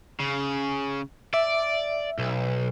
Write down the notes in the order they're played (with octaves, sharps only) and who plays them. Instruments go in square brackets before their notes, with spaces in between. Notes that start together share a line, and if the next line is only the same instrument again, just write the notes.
[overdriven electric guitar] C#3
[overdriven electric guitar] D5 [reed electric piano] E5
[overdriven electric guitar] B1